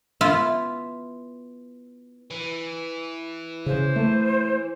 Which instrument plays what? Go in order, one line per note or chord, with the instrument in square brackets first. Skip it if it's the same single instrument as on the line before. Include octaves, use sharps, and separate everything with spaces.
[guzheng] B3 E4 F4 E5
[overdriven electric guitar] E3
[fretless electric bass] C#3 [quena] C5
[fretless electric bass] A3